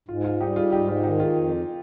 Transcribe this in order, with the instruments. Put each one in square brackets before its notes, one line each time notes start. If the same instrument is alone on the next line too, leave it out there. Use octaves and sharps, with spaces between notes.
[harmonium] G#2 [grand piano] F4
[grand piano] F4
[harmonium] G3 [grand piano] D#4 G4
[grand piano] F4 G#4
[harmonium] G#2 [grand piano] D#4 G4
[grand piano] F4
[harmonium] D#3 [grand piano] D#4 G4
[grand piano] F4 G#4
[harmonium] F2